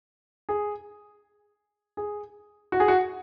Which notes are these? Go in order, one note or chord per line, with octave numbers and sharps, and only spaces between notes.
G#4
G#4
F#4
G#4
F#4